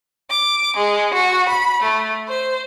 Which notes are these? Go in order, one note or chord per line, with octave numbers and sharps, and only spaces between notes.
D6
G#3
F#4
B5
A3
C5